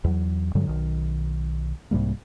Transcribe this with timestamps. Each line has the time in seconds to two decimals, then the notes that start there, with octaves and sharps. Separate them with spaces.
0.04 E2 F#3
0.55 G2 D3 F#3 G#3
0.67 B1 D#3
1.91 C2 G#2 G3 A#3